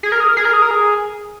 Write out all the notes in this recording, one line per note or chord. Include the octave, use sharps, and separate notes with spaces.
G#4
A#4
G#4
A#4
G#4
A#4
G#4
A#4
G#4